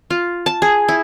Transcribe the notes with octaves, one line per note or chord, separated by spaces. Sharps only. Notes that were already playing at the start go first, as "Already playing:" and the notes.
F4
A5
G#4
E4